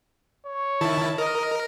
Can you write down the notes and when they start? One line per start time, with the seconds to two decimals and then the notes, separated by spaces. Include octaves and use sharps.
0.46 C#5
0.81 D#3 E4 A5
1.18 A#4 D#5